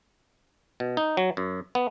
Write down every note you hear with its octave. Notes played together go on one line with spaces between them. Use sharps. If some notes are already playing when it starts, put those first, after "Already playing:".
B2
D#4
F#3
F#2
B3